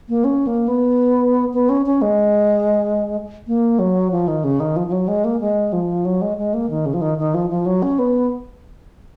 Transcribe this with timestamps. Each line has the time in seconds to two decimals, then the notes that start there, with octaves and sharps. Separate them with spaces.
0.09 A#3
0.24 C#4
0.47 A#3
0.68 B3
1.54 B3
1.69 C#4
1.86 C#4
2.02 G#3
3.47 A#3
3.79 F#3
4.12 F3
4.28 D#3
4.44 C#3
4.60 D#3
4.76 F3
4.88 F3
4.92 F#3
5.08 G#3
5.24 A#3
5.40 G#3
5.73 F3
6.05 F#3
6.22 G#3
6.37 G#3
6.54 A#3
6.70 D#3
6.86 C#3
6.94 F3
7.01 D#3
7.18 D#3
7.34 F3
7.50 F3
7.66 F#3
7.83 C#4
7.99 B3